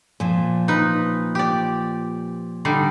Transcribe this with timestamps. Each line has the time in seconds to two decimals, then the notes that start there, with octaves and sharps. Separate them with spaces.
0.20 A#2 F3
0.68 D#4 B4
1.35 G4 D5
2.65 D3 G3 D#4